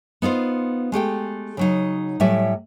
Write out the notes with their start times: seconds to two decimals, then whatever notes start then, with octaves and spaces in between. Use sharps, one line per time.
0.22 B3 D#4 F4 C5
0.92 G#3 A3 G4 G5
1.57 C#3 F#3 D#4
2.20 A2 F#3 G3 D5 E5 G#5